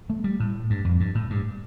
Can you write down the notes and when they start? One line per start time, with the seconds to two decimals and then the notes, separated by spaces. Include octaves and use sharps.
0.10 A3
0.24 G3
0.40 A2
0.70 G2
0.85 F2
1.00 G2
1.15 A2
1.30 G2